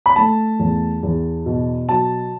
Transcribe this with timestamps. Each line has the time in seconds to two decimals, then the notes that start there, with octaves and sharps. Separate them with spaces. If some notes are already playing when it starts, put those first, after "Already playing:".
0.06 B5
0.16 A3 A5
0.59 E2
1.03 E2
1.46 B2
1.89 F#3 A5